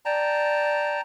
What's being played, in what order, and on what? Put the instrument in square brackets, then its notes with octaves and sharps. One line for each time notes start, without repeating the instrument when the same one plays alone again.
[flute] D5 [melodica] G5 A5 A#5